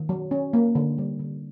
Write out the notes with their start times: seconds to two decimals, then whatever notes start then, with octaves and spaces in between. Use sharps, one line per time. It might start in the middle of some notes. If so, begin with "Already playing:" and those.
Already playing: D#3
0.09 F#3
0.31 C#4
0.53 A#3
0.75 D3
0.98 G3
1.19 D3